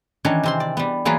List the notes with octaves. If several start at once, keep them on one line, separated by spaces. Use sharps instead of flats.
D#3 E3 C#4 D4 C#5
C3 C4 C6
D5
G3 B3
E3 F#3 A#3 F4 G#4 B4